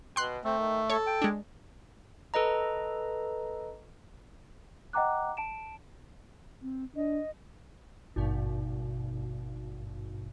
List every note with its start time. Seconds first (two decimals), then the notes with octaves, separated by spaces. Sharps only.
0.16 B2 G5 C6 F#6
0.44 A3 C4
0.59 D#3
0.90 A4 C#5 C#6
1.07 G5
1.22 G#3 D4
2.34 A4 B4 D#5 A#5
4.93 D#5 F#5 G5 A#5 D6 F#6
5.37 A5 D7 E7
6.62 C4
6.96 D4 D#5
8.16 G#1 G2 B2